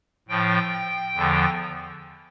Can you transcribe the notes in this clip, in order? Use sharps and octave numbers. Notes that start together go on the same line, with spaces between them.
A2 F3 G5
E2 D3 F3